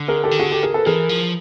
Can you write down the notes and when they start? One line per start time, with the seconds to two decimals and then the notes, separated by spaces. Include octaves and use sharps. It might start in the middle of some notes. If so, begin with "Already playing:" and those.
Already playing: D3
0.08 G#4 A#4
0.24 G4 A4
0.31 D#3
0.39 D3 F#4 G#4
0.51 G4 A4
0.63 G#4 A#4
0.74 A4 B4
0.86 E3 G#4 A#4
1.09 F3